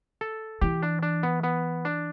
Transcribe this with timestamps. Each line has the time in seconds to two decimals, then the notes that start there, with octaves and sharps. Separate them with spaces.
0.21 A4
0.61 E3 G4
0.83 D4
1.03 D4
1.23 B3
1.43 B3
1.85 D4